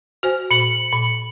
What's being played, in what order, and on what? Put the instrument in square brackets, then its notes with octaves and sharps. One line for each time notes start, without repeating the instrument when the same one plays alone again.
[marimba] F#4 C5 G#5
[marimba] A#2 [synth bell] C#7 F#7
[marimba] A#2